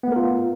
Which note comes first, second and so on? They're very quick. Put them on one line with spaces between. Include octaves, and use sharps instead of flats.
B3 A3 A#4 F4